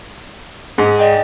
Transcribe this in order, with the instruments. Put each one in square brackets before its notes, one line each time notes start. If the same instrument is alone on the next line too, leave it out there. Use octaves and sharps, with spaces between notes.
[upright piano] G#2 [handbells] G#4 G#5
[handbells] D5 D#5 G5